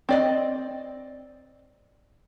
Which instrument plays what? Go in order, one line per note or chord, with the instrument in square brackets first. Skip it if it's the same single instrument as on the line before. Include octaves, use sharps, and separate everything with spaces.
[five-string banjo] C4 D5 D#5